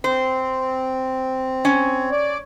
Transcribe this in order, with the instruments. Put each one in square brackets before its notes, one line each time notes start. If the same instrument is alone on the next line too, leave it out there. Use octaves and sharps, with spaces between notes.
[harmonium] C4 [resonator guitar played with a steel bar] C5
[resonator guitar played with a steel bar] C#4
[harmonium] D5